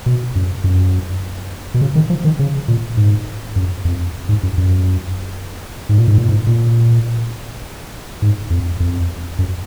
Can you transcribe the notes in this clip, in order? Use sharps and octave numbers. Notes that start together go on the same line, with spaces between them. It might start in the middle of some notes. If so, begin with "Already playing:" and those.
B2
F#2
F#2
B2
C#3
D#3
F3
D#3
C#3
A#2
G#2
F#2
F2
G#2
F#2
F#2
G#2
A#2
G#2
A#2
G#2
A#2
G#2
F2
F2
F#2